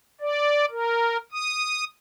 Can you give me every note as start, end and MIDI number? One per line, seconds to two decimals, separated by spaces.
0.21 0.65 74
0.70 1.17 70
1.32 1.84 87